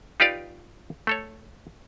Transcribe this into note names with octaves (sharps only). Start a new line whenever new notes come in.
D#4 F4 G4 B4 D5 F5
A3 A4 C#5